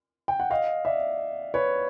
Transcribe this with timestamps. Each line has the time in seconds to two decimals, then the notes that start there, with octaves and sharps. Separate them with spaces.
0.28 G5
0.40 F#5
0.51 D#5 F5
0.85 D5 E5
1.54 B4 C#5